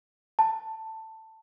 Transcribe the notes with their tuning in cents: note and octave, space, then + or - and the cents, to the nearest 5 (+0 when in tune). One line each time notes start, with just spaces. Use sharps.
A5 +10